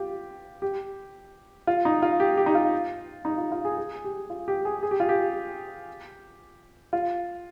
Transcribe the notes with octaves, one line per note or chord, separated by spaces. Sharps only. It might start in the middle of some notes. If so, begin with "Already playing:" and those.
Already playing: F4 G4
G4
F4
D#4
F4
G4
G4
D#4
F4
D#4
F4
F4
G#4
G#4
G4
F4
G4
G#4
G#4
G4
F4
G4
F4